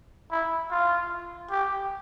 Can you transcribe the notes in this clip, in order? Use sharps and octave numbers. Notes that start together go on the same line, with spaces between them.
E4
F4
G4